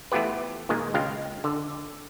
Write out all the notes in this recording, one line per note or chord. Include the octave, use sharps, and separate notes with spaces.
E3 A3 B3 F4 G4 B4
A#2 D#3 G#3
C#2 G#3 F4 F5 G5
D3